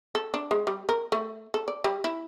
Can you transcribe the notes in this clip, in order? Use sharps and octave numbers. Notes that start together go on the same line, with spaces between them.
A4
D4
G#3
G3
A#4
A3
A4
D5
G3
E4